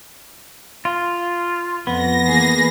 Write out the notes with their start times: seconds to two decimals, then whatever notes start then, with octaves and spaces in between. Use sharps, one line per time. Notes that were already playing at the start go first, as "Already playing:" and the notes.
0.85 F4
1.87 F2 B3 A#6
2.26 E3 A#3 G#4